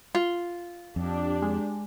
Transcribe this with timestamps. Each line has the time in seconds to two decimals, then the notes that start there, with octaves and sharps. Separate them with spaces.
0.15 F4
0.96 F2 D4 G4
1.42 G#3